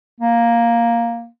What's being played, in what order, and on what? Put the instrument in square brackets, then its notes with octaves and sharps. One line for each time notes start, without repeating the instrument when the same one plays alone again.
[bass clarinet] A#3